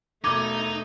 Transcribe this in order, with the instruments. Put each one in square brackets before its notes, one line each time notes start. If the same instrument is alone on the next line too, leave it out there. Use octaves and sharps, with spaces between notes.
[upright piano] E1 G#6 [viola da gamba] B2 A3 [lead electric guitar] D#4 D#5 [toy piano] D6